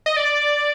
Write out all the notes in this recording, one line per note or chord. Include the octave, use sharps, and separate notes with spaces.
D#5
D5